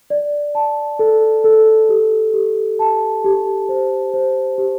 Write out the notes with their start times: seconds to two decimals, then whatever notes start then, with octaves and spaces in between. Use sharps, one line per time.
0.10 D5
0.55 A5
0.99 A4
1.44 A4
1.89 G4
2.34 G4
2.79 A5
3.24 G4
3.69 C5
4.14 C5
4.58 G4